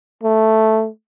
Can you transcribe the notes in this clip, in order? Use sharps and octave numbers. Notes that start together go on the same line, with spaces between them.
A3